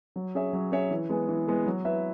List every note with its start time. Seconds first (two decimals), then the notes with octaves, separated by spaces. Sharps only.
0.16 F#3
0.34 C#4 G#4 C#5 E5
0.53 F#3
0.72 C#4 G#4 C#5 E5
0.91 E3
1.09 G#3 B3 G#4
1.29 E3
1.47 G#3 B3 G#4
1.67 F#3
1.85 E4 B4 E5